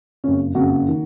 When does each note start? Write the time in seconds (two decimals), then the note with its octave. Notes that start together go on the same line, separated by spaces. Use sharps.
0.24 F#1 F2 C#3 C#4
0.55 F#1 F2 C#3 F#4
0.88 D#3